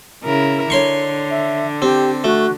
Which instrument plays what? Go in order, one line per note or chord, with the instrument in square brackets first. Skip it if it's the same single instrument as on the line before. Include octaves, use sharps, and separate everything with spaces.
[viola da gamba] C#3 E4 A#4
[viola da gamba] D3 [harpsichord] C#5 C6 C#6
[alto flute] E5
[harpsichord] C4 [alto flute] G4
[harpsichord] A3 [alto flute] F#4